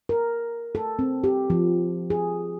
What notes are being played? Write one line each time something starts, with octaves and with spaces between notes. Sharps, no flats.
A#4
A4
C4
G4
F3
G#4